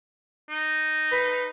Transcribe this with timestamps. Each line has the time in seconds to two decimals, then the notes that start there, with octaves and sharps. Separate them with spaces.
0.50 D#4
1.12 B4